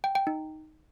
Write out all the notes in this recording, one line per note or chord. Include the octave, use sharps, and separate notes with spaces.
G5
G5
D#4